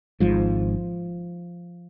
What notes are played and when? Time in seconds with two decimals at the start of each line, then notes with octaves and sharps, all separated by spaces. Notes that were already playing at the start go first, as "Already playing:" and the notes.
0.20 G#1 G#2 F3